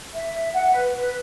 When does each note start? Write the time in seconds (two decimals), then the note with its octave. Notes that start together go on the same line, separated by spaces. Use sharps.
0.14 E5
0.54 F#5
0.72 B4
0.95 B4